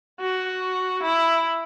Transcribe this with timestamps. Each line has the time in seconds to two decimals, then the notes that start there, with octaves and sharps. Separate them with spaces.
0.20 F#4
1.03 E4